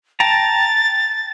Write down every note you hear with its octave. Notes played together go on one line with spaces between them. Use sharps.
G5 A5 A#5 A6